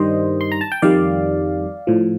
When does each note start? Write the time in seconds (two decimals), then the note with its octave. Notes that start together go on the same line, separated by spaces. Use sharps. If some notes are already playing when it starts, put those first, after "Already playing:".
Already playing: G2 D#3 G3 C5 D#5
0.41 C6
0.52 A#5
0.61 A5
0.72 G5
0.82 F2 D#3 G3 D5 F5
1.87 A2 F3